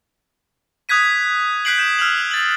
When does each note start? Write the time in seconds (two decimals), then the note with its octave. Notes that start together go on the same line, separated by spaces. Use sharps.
0.89 D#6 F#6 G#6 B6 D#7
1.65 F#6 G6 B6 C7 D7 F#7
1.78 G6 E7
1.99 E6 F6 G6 F7 F#7
2.31 A6 F#7